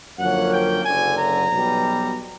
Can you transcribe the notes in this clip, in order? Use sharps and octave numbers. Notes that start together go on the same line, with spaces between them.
F#2 D3 F3 A#3 C#4 F#5
G5
F#1 F#2 D3 G#5
A#5
B1 B2 G3